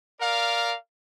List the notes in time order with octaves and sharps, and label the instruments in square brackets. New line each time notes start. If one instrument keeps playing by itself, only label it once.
[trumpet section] A#4 D5 F5